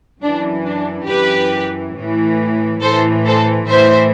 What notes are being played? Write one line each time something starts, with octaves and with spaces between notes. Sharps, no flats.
F#2 E3 D4
D4
F#2 E3 G4 B4
A2 E3
A2 E3 A4 C5
A4 C5
A2 E3 C5 E5